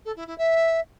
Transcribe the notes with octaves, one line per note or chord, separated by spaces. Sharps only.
A4
E4
E4
E5